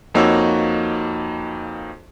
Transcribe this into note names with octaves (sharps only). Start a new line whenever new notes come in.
F2 A#3 D#4 F#4 C#5 E6